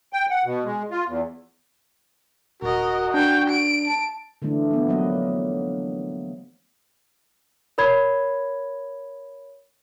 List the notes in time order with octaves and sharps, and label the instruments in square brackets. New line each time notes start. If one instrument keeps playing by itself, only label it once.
[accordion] G5
F#5
B2
G#3
F4
E2
[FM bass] D#1 [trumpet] F#4 [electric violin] A#4 D#5
[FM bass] D4 [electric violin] G5
[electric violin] D7
[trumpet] A5
[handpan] D3 E3 A3 D4
F3 B3
F#3 A#3 D#5
[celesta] A#4 C#5 B5 G#6